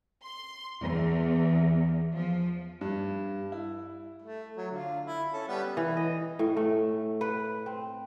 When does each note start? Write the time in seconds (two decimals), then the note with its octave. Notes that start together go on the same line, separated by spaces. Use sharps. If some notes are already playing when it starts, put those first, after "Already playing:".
0.25 C6
0.81 E2
2.15 F3
2.81 G2
3.52 E4
4.22 A3
4.57 F#3
4.72 D3 F4
5.06 E4
5.33 C#4 A4 A5
5.48 G3 B3 C#4
5.77 E3
5.97 D#5
6.39 A2
6.57 A3
7.21 B4
7.66 C4